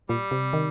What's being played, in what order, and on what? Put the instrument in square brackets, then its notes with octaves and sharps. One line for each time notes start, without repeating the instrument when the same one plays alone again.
[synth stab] A#2 [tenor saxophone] G3
[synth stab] C3
D#3